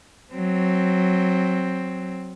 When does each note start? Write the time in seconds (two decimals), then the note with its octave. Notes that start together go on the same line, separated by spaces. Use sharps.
0.33 F#3 C4